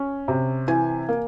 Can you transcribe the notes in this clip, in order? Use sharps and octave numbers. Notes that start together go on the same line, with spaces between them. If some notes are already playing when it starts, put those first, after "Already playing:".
Already playing: C#4
C3
E3 G#5
A#3